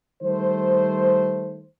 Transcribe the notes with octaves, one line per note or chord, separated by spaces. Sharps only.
D#3 G3 A3 C5